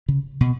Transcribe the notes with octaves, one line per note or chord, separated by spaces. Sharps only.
C#3
B2